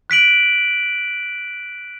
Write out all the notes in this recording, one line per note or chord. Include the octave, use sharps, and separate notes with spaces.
F#6 B6 D7 F#7